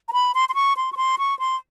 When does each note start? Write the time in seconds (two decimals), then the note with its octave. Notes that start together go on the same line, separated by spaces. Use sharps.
0.08 A#5
0.13 B5
0.34 C6
0.49 C6
0.54 C#6
0.77 C6
0.92 C#6
0.97 C6
1.18 C#6
1.39 C6